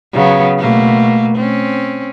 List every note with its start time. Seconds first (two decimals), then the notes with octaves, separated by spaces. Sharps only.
0.13 C#3 F#3 B3
0.59 B2 A3 A#3
1.37 C4 C#4